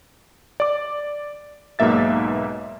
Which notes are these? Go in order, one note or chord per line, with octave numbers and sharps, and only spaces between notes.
D5 D6
B1 G#2 B2 A#3 E5 A6